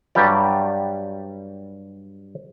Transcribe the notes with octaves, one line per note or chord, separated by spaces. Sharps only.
G2 F#3 G3 G4 D5